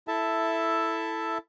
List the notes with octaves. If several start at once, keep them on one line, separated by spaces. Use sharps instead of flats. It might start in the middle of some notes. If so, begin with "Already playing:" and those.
E4 A4 E5 A5